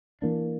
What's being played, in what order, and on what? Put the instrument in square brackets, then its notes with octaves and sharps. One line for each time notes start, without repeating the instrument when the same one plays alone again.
[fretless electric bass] E3 A#3 D4